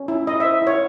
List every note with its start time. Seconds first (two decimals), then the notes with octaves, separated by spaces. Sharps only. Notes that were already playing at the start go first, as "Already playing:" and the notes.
Already playing: C#4
0.08 E4
0.27 E4 D#5
0.40 C5 E5
0.62 E4 C#5